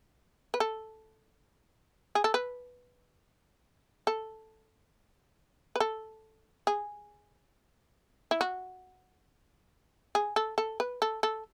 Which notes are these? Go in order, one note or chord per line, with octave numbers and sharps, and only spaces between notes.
B4
A4
G#4
A4
B4
A4
B4
A4
G#4
E4
F#4
G#4
A4
A4
B4
A4
A4